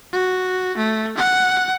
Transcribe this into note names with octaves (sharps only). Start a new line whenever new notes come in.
F#4
A3
F#5